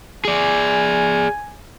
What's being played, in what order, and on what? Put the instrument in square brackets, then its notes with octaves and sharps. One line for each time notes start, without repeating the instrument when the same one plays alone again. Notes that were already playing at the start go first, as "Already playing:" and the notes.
[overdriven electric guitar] G#4 D5 [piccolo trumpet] G#5